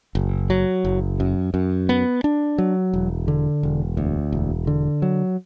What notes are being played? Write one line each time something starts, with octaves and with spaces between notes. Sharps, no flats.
F#1
F#3
F#1
F#2
F#2
B3
D4
F#3
E1
D3
E1
D2
E1
D3
F#3